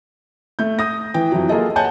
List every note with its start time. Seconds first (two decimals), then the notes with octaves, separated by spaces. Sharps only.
0.59 A3 G6
0.79 D#6 A#6
1.14 E3 G5
1.32 F2 E3 F#3
1.49 A#3 F4 G#4 A4 D#5
1.76 C#5 F#5 G#5 A5 G6